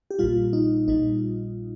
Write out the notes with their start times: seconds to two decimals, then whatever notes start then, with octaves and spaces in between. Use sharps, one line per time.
0.11 G4
0.19 A#1 A#2 G3 F4
0.53 D#4
0.88 A#1 A#2 G3 D#4